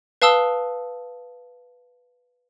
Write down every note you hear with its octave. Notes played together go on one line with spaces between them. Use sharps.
B4 F5 A5 D#6 E6 G7